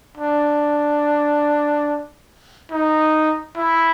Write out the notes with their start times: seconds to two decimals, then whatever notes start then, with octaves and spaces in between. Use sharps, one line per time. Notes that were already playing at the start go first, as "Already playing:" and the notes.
0.17 D4
2.71 D#4
3.56 E4